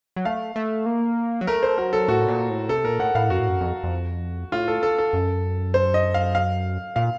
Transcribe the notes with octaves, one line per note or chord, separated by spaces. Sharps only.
F#3
A3 F5
A3
A#3
F#3
A3 A#4
C5
F#3 A#4
A4
A2 F#4
A#2
A2
C3 A4
A#2 A#4
A2 F#5
A2 F5
F#2 F#4
A2
F#2
F2
F2
A2 F4
A4
A4
A4
F#2
C5
D#5
F5
F5
A#2 F5